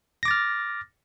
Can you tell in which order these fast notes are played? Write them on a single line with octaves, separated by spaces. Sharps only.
A#6 D6 A6 F6